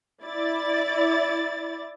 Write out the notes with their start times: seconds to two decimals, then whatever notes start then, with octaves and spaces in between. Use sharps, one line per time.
0.24 E4 D5 A6